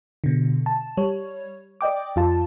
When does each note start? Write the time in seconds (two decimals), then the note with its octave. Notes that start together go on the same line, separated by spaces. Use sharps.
0.24 B2 D3
0.66 A5
0.97 G3 C#5
1.81 D5 D#5 G5 D6
2.16 F2 F4 A5